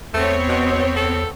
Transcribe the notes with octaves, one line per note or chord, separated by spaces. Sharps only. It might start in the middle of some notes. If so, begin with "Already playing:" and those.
E2 A3 B3 C4 C#5
B2
A4